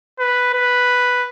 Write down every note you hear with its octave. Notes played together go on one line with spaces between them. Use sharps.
B4
B4